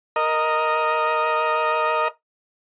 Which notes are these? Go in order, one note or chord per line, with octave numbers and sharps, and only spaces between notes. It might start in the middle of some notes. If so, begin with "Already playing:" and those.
A#4 D#5